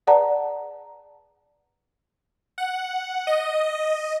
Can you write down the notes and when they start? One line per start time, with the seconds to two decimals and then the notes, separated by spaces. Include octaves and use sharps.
0.07 G#4 B4 D5 F#5 A5 A#5
2.58 F#5
3.27 D#5